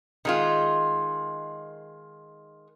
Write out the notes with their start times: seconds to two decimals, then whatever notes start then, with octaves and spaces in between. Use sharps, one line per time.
0.25 D#3 G#3 F4